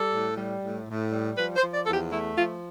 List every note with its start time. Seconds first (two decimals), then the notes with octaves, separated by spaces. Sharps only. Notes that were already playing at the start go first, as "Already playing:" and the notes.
Already playing: G3 A4
0.13 A2
0.37 G3
0.62 A2
0.88 A2
1.12 G3
1.38 F3 B4
1.56 C5
1.61 F3
1.74 D5
1.86 E2 A4
1.94 G4
2.11 A3 E4
2.36 F3 F4